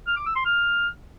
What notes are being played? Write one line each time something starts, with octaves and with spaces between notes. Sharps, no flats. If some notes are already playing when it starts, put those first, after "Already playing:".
F6
D6
E6
C6
F6